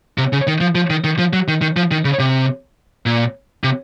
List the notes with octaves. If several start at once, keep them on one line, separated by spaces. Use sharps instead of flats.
C3
C#3
D#3
F3
F3
D#3
D#3
F3
F#3
D#3
D#3
F3
D#3
C#3
C3
A#2
C3